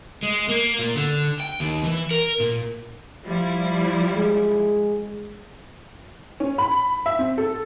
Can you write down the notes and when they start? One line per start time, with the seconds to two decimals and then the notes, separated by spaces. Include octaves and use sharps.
0.23 G#3
0.49 A#3
0.79 A#2
0.96 D3
1.40 G5
1.60 D#2
1.83 E3
2.11 A#4
2.40 A#2
3.26 F3 G3 E4
4.17 G#3
6.40 C#4
6.58 B5
7.06 E5
7.19 C4
7.38 A4